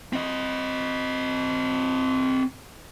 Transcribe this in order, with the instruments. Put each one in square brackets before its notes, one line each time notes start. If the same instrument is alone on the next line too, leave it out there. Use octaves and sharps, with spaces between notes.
[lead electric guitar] C4 D#5